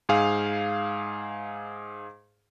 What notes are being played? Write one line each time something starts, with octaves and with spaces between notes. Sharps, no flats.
G#2 G#4 F5